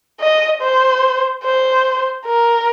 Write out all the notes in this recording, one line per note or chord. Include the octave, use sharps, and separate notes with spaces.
D#5
C5
C5
A#4